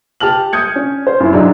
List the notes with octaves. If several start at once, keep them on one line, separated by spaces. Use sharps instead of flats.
G4 A5 F6 F#7
D#6 G6 G#6 C#7
C#4
C5
F#2 E4
G#2 F#3 G#3 D4 E4